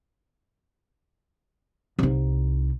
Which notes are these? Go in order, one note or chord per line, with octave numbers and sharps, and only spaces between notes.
C2 D#4